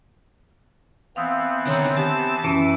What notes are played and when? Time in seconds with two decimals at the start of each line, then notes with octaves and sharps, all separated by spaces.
1.16 E3 B3 C4 F5 D#6 E6
1.67 D3 D#3 C#5 A#5
1.97 G4 A5
2.44 F#2 E3 C#4